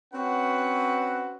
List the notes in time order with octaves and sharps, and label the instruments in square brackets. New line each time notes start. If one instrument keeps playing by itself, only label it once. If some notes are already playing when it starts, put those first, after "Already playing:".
[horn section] C4 C#4 F#4 B4 F#5